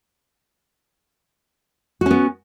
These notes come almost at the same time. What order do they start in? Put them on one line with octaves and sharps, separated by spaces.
F#4 C#4 B3